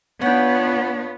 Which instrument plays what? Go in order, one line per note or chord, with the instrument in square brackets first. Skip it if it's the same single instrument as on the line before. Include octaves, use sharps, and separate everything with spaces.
[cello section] B3 F4 [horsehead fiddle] D4 C#5 [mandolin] F#5 G5